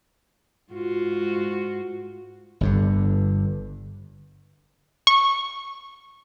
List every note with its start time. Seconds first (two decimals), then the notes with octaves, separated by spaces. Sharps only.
0.73 G#2 F4 F#4
2.61 G1 G2 D3
5.07 C#6